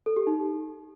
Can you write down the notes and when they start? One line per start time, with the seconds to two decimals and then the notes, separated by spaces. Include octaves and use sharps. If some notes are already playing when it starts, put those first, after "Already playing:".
0.06 A4
0.16 G4
0.27 D#4